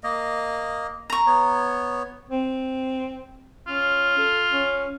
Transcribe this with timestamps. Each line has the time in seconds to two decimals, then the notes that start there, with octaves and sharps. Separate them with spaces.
0.04 A#3 D#5
1.10 A#5 C#6
1.27 B3 C#5
2.29 C4
3.67 C#4 F4
4.18 A4
4.49 C#4